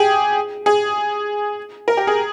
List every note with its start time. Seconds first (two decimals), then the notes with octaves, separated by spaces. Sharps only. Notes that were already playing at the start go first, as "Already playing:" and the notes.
Already playing: G4 G#4
0.66 G#4
1.88 A#4
1.97 G4
2.07 G#4